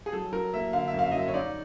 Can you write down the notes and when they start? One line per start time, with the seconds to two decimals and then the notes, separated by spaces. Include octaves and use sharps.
0.06 G#4
0.13 F#3 A4
0.32 F#3 A#4
0.54 A#3 E5
0.73 D3 F5
0.88 E5
0.94 F#2 F5
1.04 E5
1.11 F#3 D#5
1.19 E5
1.28 C#5
1.34 D#4 D5